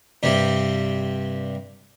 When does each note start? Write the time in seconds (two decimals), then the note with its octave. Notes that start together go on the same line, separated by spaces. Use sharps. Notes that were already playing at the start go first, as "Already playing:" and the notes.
0.23 G2 C3 G3